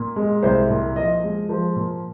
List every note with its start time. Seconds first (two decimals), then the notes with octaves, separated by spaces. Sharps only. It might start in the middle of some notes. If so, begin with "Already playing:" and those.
Already playing: A#2
0.16 G#3
0.43 C2 C5
0.70 A#2
0.96 F3 D#5
1.23 G#3
1.49 F3
1.76 A#2